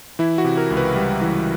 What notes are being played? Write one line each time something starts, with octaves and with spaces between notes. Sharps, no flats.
E3 E4
F#4
C3
A#4
C#2
B4
G3
E3